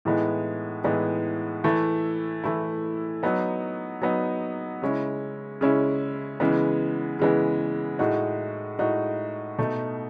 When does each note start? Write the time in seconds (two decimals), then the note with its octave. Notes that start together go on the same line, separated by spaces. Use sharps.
0.05 A2 E3 G#3 B3 D#4
0.84 A2 E3 G#3 B3 D#4
1.64 E3 A3 E4
2.44 E3 A3 E4
3.23 F#3 B3 D#4
4.02 F#3 B3 D#4
4.82 C#3 G#3 C#4 E4
5.61 C#3 G#3 C#4 E4
6.40 C#3 E3 G#3 B3
7.19 C#3 E3 G#3 B3
7.99 A2 G#3 D#4 F#4
8.79 A2 G#3 D#4 F#4
9.58 B2 A3 D#4